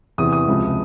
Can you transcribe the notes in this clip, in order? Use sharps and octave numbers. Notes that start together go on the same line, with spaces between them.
E2 C3 E3 D#6
D#6
C#2 C3 F3